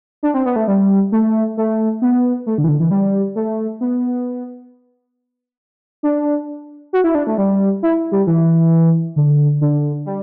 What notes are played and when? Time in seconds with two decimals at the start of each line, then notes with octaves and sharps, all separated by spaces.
0.23 D4
0.34 C4
0.46 B3
0.56 A3
0.68 G3
1.12 A3
1.57 A3
2.02 B3
2.46 A3
2.58 D3
2.64 E3
2.68 D3
2.80 E3
2.91 G3
3.36 A3
3.81 B3
6.03 D4
6.93 F#4
7.04 E4
7.15 D4
7.27 A3
7.38 G3
7.83 E4
8.12 G3
8.27 E3
9.16 D3
9.61 D3
10.06 G3